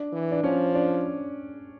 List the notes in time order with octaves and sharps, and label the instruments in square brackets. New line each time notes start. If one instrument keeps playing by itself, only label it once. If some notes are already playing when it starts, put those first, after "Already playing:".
Already playing: [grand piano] D4
[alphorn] E3
[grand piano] D4
[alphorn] F3 [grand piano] C#4
[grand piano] D4